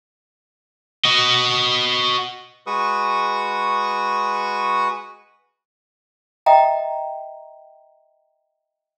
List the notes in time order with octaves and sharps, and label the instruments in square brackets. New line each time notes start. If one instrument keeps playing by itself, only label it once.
[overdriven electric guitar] F#4 D#5
[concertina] G#3 F#4 B4 C#6 D#6
[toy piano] D#5 E5 G5 A#5